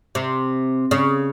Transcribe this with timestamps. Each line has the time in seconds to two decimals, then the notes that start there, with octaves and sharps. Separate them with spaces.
0.15 C3
0.91 C#3